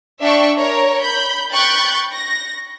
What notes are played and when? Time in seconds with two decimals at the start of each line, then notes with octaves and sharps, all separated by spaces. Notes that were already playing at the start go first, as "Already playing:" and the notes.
0.21 D4 E5 G5 A5 C#6
0.58 A#4 C#5 A#5
1.01 B5 G6
1.51 G5 B5 C#6 F#6 G6 A6
2.13 A#6